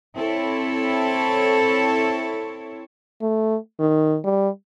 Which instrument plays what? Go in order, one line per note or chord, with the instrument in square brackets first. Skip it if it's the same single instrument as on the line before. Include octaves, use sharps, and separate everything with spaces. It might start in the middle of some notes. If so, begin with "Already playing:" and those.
[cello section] C4 E4 A4 C#5
[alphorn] A3
D#3
G3